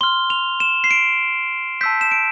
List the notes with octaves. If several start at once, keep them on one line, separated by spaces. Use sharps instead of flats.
C6 F6 G7
F7
E7
C7
D7
A5 E6 G6 B6
E7
D7